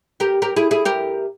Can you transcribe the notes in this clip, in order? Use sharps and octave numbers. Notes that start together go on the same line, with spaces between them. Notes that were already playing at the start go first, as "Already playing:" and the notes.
G4 A#4
G4 A#4
E4 G#4
E4 G#4
G4 A#4